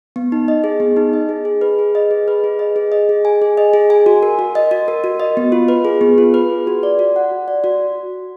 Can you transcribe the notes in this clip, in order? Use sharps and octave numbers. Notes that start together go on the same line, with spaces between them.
B3
D#4
D#5
G#4
B3
D#4
D#5
G#4
G#4
B4
G#4
D#5
G#4
B4
G#4
D#5
G#4
D#5
G#4
G#5
G#4
D#5
G#4
G#5
F#4
A#4
F#4
D#5
F#4
A#4
F#4
D#5
B3
F4
B4
G#4
B3
F4
B4
G#4
F#4
D5
F#4
F#5
F#4
D5
F#4